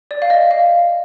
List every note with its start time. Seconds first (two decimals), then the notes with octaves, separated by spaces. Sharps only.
0.11 D5
0.22 F5
0.30 D#5
0.51 F5